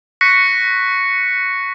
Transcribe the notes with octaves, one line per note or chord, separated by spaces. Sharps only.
C#6 F#6 A#6 B6 C#7